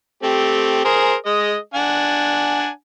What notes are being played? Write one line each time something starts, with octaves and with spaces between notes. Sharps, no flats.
A3 C4 G4
G#4 A#4 C5
G#3 D#5
D4 F#5 G#5